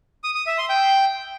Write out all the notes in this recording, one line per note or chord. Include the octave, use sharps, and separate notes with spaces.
D#6
D#6
E5
C6
G5